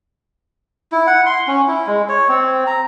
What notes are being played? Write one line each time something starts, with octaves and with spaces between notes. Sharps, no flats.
E4
F#5
C6
C#4
E4
G#3
C#5
C4
A#5